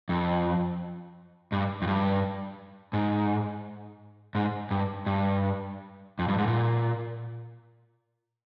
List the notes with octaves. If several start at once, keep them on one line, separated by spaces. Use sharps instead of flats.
F2
G2
F2
G2
G#2
G#2
G2
G2
F2
G2
G#2
A#2